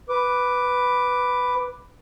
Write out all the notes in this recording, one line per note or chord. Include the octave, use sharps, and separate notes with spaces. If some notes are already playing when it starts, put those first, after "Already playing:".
B4 D6